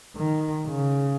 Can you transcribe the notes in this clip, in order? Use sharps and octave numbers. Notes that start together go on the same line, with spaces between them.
D#3
C#3